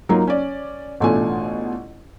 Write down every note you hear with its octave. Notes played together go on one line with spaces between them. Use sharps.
F#3 A#3 D#4 F4
C#4 D5
A1 B2 A3 D4 F4 G#5